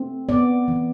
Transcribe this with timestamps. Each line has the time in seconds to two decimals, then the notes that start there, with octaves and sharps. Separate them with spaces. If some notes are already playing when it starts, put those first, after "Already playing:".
Already playing: A3 C4
0.29 B3 D5
0.68 E3